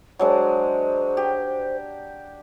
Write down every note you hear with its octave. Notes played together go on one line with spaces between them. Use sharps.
F#3 G#3 D4 C5
G4